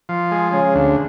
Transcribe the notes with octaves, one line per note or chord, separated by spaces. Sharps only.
F3
G#3
C#3 G#3
D2